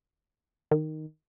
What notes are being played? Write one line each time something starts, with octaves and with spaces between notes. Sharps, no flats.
D#3